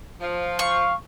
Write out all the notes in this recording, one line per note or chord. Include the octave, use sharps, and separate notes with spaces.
F3
F5 C#6